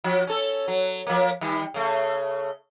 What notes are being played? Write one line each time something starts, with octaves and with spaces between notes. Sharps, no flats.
F3 F#4
C#4 A4
F#3
F3 A#3
D#3 G3
C#3 A3